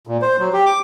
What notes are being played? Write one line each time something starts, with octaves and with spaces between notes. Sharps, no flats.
A#2
C5
F#3
G4
D6